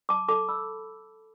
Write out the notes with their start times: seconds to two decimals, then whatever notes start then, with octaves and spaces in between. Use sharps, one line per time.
0.09 A5 D6
0.28 A4 A5 D6
0.49 B5 E6